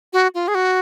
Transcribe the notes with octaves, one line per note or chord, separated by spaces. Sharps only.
F#4
F4
G#4
F#4